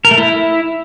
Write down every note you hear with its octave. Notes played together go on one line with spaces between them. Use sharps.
A#4
A3
E4